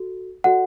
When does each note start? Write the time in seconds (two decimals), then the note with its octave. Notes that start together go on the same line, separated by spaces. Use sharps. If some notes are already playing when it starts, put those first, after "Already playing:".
Already playing: F#4 A4
0.44 F#4 A4 D5 F#5